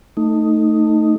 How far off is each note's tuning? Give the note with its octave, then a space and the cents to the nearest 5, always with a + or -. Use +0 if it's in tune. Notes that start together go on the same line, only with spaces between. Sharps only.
A3 +15 D#4 +0